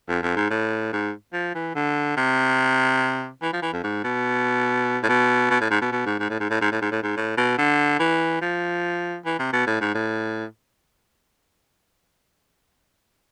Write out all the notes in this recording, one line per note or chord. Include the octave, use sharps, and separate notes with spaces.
F2
F2
G#2
A2
G#2
F3
E3
D3
C3
E3
F3
E3
F2
G#2
B2
A2
B2
B2
A2
G#2
B2
B2
G#2
G#2
A2
G#2
A2
G#2
A2
G#2
A2
G#2
A2
B2
D3
E3
F3
E3
C3
B2
A2
G#2
A2